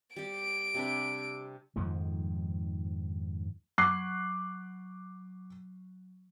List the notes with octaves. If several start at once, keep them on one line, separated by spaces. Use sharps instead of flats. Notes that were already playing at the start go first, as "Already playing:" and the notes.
G3 G4 D7
C3 D4 B4
F2 G#2 D#3 F3
F#3 D6 F#6 C7